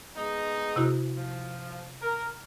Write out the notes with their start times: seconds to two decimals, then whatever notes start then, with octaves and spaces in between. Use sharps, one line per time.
0.17 G#3 B3 D#4
0.76 C3 E4 F#4
1.17 F3
2.01 A#4